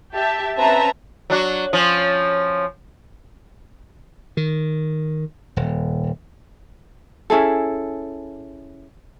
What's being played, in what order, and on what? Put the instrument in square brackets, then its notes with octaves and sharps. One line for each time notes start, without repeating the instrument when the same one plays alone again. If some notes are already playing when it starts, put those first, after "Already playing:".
[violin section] G4 E5 A5
C4 C#4 B4 E5 A5 A#5
[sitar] F#3 D4 F#4
F3 C#4
[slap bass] D#3
D#1
[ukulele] C#4 E4 G#4 A4